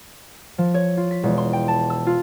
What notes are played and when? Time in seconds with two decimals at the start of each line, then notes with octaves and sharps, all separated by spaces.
0.58 F3
0.74 C#5
0.97 F4
1.11 B6
1.23 E1
1.38 C6
1.53 G5
1.68 A5
1.90 E6
2.07 F4